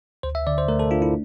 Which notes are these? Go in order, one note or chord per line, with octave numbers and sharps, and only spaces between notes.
D2 C5
E5
D3 D5
C5
A3 A#4
A4
D4 F4
E4